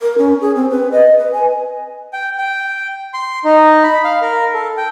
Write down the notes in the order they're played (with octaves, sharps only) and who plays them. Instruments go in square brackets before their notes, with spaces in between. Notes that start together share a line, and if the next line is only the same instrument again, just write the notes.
[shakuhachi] A#4
C#4
G#4
C4
B4
D#5
B4
G#5
[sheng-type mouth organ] G5
G5
C6
D#4
B5
F5
A#4
A4
G5